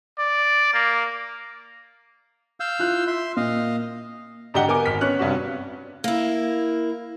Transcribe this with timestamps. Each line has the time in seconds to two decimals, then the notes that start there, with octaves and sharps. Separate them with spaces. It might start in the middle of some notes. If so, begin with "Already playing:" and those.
0.18 D5
0.73 A#3
2.60 F5 E6 G6
2.79 E4 F4 F#6
3.07 E5 C6
3.37 A#2 D#5 F5
4.54 G#2 D3 G4 D#5 F#5 G7
4.68 B3 A#4 G#5 D6
4.86 G#1 F6 B6
5.01 B3 C#4 F#6
5.19 G2 C3 F#4
6.04 A#3 E4